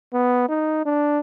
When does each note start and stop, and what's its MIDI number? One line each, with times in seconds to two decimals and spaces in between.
0.14 0.48 59
0.49 0.83 63
0.86 1.20 62